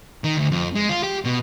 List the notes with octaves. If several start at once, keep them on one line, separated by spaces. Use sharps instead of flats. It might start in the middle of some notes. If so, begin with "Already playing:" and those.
D#3
D2
F2
G#3
F4
G4
B2